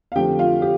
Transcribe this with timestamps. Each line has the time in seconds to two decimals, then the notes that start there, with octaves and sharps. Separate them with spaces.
0.12 F5
0.15 F2 D3 F3 A3 G4 G5
0.39 F4 F5
0.62 G4